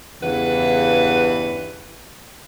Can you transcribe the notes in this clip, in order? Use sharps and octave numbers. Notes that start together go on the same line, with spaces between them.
E2 G2 C#3 E3 B4 F#5